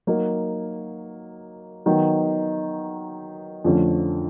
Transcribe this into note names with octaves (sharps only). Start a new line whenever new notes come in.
F#3 A#3 D#4
D#3 F#3 B3 D#4
F2 D3 F3 A3 C#4